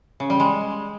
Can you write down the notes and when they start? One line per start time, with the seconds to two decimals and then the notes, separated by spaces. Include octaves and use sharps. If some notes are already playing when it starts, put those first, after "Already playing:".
0.20 C#3
0.30 G3
0.40 G#3